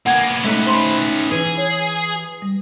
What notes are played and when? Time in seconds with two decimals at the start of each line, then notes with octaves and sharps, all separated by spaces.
0.06 A#3 B3 F#5 G#5 G#6
0.44 A3 C#4 D#4 B4
0.66 C5 B5 C6
1.31 E3 G#4
1.58 C#5
2.42 G3